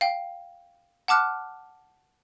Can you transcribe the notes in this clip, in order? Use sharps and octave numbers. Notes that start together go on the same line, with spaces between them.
F5 G5
F#5 A5 D6 F6 F#6